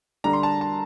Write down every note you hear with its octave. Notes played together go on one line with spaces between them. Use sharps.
D3 G3 D4 A#5
C6
A5
A5